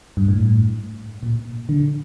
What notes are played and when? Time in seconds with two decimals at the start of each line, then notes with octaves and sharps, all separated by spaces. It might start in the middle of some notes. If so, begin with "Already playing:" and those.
0.17 G2
0.28 A2
1.23 A#2
1.69 D3